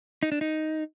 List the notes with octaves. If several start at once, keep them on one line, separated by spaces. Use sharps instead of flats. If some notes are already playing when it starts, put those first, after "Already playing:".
D#4
D4
D#4